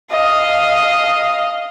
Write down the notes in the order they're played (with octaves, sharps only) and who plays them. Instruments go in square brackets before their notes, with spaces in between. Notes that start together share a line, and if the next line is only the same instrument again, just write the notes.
[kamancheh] D#5 F5